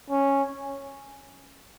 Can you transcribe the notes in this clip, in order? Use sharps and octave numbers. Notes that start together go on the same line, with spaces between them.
C#4